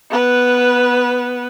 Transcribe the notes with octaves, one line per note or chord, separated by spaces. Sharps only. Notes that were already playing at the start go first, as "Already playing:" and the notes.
B3 B4